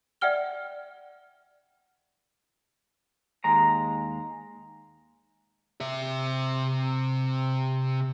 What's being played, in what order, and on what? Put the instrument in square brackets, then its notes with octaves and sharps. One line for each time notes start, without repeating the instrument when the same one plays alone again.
[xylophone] D5 E5 F#5 G5 F6 G7
[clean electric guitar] D#2 G#3 A#5
[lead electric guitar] C3 E5